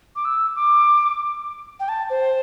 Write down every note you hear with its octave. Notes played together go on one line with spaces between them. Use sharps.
D6
E6
D6
G5
A5
C5